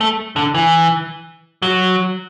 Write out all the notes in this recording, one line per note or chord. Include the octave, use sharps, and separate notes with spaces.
A3
D3
E3
F#3